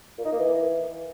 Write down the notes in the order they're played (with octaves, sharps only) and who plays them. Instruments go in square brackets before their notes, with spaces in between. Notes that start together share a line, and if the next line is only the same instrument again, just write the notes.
[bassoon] A#2
D#4
A#3
E3